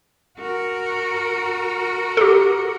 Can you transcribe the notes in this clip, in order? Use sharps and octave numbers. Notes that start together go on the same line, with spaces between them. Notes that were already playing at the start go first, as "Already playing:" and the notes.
F#4 A#4
G4 A4